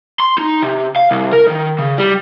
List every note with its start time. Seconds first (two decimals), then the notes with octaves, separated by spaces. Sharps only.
0.20 C6
0.38 D#4
0.63 C3
0.96 F5
1.11 C2
1.32 A#4
1.47 D#3
1.79 C#3
1.98 G3